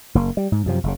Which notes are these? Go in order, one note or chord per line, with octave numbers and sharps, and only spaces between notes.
F#1 A#3
G3
G#2
F#2 C3 F3
F#1 C#3